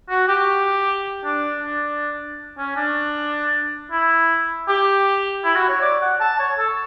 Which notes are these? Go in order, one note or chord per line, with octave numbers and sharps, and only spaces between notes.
F#4
G4
D4
D4
C#4
D4
E4
G4
E4
F#4
C#5
D5
F#5
A5
C#5
A4